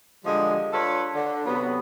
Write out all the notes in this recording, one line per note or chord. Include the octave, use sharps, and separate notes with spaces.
D3 F3 G3 G#3
D4 F4 A4 B4 C#5
D3
C3 F#3 B3